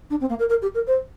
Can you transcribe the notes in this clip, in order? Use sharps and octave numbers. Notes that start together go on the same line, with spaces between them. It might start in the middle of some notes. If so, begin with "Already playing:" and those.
D4
C4
A#3
A#4
A#4
G4
A#4
C5